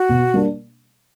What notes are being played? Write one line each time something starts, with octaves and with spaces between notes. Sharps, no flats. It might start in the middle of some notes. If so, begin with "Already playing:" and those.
Already playing: F#4
B2
G3 A#3 D4